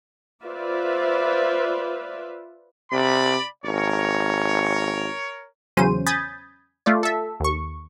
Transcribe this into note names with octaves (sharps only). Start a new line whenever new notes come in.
F4 B4 C5 D5 E5
C3 D5 B5
G#1 A#4 C#5
E2 C#3 F#3 C#4 C5 D#7
G#5 B5 D#6 G6 A6
A3 F4 D5
A4 E5
D#2 C#6